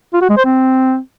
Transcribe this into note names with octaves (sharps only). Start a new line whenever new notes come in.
F4
F#4
G#3
C5
C4